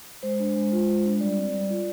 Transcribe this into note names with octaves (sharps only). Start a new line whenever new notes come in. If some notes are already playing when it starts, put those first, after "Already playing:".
G#3 C5
D4
G#3
F4
G#3
D4
G3 D5
C4
G3
F4